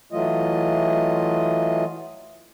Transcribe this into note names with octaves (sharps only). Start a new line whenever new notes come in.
E3 F#3 A3 F4 D#5